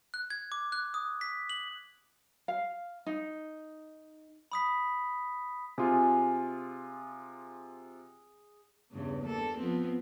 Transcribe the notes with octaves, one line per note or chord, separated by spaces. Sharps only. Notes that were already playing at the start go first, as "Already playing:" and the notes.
F#6
G#6
D6
F#6
D#6
B6
F#7
F5
D#4
B5 D#6 B6
C3 F4 G#4
E2 G2 C#3
A#3 A4
F3 B3 C4